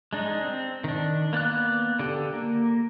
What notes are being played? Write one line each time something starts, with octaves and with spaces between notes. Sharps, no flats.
G#3 D4 D#4
C4
D#3 D4
A#3 B3 D5 F#6
D3 G4 A4
A#3